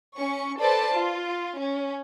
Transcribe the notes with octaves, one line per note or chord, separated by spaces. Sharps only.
C#4 C#6
A4 B4 C5 D5 A5
F4
C#4